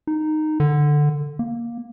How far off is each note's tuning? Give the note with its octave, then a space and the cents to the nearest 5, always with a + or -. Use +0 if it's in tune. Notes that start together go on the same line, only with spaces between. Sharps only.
D#4 -10
D3 +10
A#3 +10